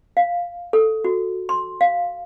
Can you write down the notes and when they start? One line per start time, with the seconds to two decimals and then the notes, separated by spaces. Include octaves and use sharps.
0.17 F5
0.73 A4
1.04 F#4
1.49 C6
1.81 F5